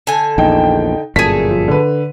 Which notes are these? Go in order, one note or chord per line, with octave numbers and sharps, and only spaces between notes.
D3 G#5
A#1 E2 D#4 G5
G1 F#2 A#2 A3 G#4 B6 D#7
F3
D3 B4